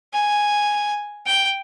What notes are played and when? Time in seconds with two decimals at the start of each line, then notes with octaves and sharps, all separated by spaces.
0.14 G#5
1.26 G5